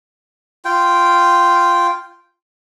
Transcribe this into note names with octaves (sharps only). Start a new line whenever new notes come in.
F4 G5